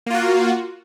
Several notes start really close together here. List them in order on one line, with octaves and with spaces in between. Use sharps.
A#3 F4 F#4